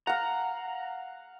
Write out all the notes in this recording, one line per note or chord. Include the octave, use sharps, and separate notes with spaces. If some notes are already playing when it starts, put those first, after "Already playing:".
F5 F#5 A#5